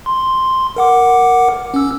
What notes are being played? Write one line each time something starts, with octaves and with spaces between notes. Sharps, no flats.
C6
A#4 F#5 D6
C#4 E6